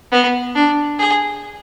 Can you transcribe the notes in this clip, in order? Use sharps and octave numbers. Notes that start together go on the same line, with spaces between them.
B3
D4
G#4